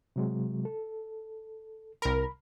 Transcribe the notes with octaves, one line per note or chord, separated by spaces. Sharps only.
C3 F#3 G#3
A4
C2 A#4 B5